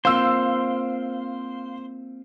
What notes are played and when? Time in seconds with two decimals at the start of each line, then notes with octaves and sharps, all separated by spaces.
0.05 A#3 C4 F4 C5 F5 E6